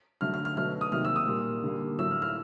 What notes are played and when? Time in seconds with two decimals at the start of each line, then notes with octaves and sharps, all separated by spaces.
0.21 D3 F#3 A3 F6
0.34 F6
0.45 F6
0.57 B2 F#3 A3 F6
0.81 D#6
0.92 C3 D#3 F#3 A#3 F6
1.05 E6
1.16 D#6
1.28 A#2 G3 A#3
1.64 D3 G3 A#3
1.99 A2 F#3 A3 E6
2.11 F6
2.22 F6